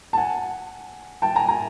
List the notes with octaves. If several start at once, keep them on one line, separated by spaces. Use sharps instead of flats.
A5
F#5 G#5
G5 A5
G#5 A#5
G#5 A#5